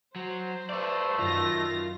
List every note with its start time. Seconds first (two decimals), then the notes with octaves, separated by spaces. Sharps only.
0.16 F#3 C5
0.70 A3 B4 D5
1.19 F#2 D#3 F4 A#6